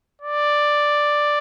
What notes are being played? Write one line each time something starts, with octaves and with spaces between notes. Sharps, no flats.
D5